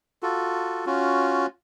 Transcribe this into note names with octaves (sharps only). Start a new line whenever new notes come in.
F4 F#4 A4
C#4 F4 F#4